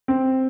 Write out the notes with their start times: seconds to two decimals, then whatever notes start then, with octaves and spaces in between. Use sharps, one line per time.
0.08 C4